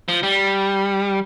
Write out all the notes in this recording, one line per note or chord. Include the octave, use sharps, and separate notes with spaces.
F3
G3